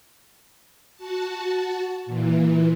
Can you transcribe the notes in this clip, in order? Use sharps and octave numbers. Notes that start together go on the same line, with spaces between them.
F#4 A5
A#2 E3